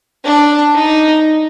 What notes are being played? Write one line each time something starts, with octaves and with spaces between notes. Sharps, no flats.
D4
D#4